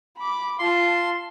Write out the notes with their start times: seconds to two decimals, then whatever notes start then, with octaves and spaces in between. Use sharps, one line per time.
0.17 B5 D6
0.59 F4 A5 C6